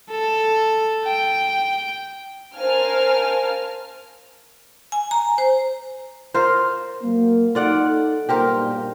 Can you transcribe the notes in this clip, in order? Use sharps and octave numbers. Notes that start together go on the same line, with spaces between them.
A4
G5
A#4 C5 F5 G#5 A5 F6
G#5
A#5
C5
F4 A#4 C5
F#3 A#3
D#4 F4 A4 D5 F#5
B1 G2 A#2 G4 A#4 C5